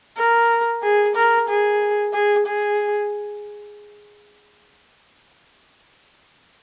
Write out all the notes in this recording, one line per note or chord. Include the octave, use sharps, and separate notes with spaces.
A#4
G#4
A#4
G#4
G#4
G#4